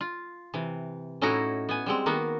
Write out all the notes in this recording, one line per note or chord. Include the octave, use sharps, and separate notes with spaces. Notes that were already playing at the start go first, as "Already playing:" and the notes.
F4
C3 E3
A2 C#4 D#4 E4 F#4 A#5
B3 G#5
G3 G#3 C4
D#3 A#3 B3 F#4 A#4